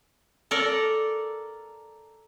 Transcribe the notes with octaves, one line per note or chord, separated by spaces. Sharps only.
A4 A#4 D5